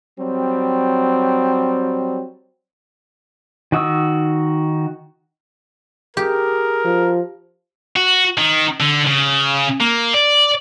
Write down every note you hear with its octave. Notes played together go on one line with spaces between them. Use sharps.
F#3 G3 C4
D#3 F#4 D#6 E6
G4 G#4 A#4
F3
F#4
D#3
D3
C#3
A#3
D5